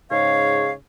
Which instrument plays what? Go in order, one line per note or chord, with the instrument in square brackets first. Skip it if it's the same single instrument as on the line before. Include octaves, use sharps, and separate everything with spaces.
[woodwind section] G#2 C#3 C#5 F5